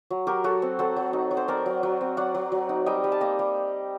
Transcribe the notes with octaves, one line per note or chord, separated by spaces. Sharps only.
F#3
F#3 G4 A#4
F#3 F#4 A4
C4
F#3 A4 C5
F#3
D#4
F#3
C5
C4 A#4 D5
F#3
F#3
C4
F#3 D5 F#5
F#3
F#3
D#4
G3 D#5 G5
G3
A5
A#3 D#5 G5
G3